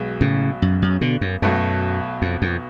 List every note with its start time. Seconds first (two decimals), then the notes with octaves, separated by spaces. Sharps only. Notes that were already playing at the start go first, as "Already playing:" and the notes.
Already playing: B1 B2 G#3
0.21 A2 C#3
0.62 F#2
0.82 F#2
1.01 B2 D3
1.21 F#2
1.42 B1 F#2 B2 A3
2.22 F2
2.42 F2